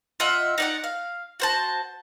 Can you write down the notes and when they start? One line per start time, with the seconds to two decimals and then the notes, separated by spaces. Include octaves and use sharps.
0.20 F4 D#5 E5 F#5
0.58 D#4 D5 F#5
0.84 F5
1.40 F#4 C5 A5